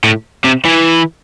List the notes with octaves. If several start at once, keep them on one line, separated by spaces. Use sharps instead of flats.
A2
C3
E3